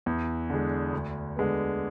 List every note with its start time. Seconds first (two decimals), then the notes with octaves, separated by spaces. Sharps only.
0.06 E2
0.50 D3 G#3
0.93 D2
1.36 D3 G#3 B3